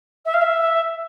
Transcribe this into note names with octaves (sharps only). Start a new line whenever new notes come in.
E5
F5
E5